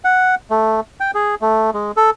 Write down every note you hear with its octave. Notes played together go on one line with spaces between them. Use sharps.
F#5
A3
G5
G#4
A3
G#3
A4